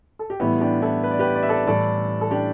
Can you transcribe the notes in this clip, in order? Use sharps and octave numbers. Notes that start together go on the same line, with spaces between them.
A4
G4
A2 E3 G3 B3 E4
D4 G4
E4 A4
B4
D5
G4 B4
D5
E5
A4 D5
A2 E3 G3 A4 D5
A4
D4 G4